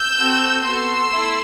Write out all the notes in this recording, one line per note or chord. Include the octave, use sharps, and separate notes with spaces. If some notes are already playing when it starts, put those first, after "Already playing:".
Already playing: E6 G6
C4 F#4 A4
B3 F#4 A4 C6 E6
A3 E4 A4